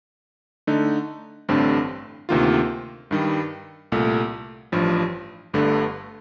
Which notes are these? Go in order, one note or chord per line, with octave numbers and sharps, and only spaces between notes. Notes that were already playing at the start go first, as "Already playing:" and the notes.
D3 A3 D#4
A1 G2 D3 A3 C4
D2 C3 D#3 A#3 F4
G2 D#3 G3
C2 A#2 A3
A1 G2 F3
G1 G2 D3 A3